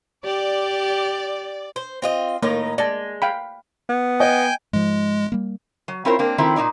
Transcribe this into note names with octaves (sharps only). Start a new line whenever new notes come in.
G4 D5
C5
C4 F4 D#5
A2 D#3 A#3 D#4
G#3 D5 A5
F5 G5 B5
B3
D#5 G5 G#5 G6
G#2 F3 G#3
G3 A#3
F#3
C4 E4 F4 A#4 C5 C#5
A#3 C4 D4
D#3 F3 A3 C4 E4
A#2 A#3 D#4 D5